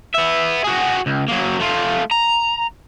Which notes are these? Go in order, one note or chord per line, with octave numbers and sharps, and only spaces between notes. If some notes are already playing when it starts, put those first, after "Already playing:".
B3 E5
F#4 G#4
C#2
F#3 A#3
A3 F4
A#5